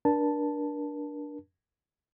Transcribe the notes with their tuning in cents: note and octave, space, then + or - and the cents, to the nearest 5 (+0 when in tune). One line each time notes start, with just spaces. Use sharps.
D4 +0 A#4 +40 A5 +0